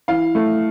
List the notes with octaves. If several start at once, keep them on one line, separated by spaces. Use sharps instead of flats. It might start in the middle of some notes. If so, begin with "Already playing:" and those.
E3 F5
A3